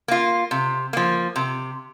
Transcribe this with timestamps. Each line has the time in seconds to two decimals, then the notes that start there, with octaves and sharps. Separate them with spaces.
0.08 A#3 F4
0.51 C3
0.93 F3 A#3
1.36 C3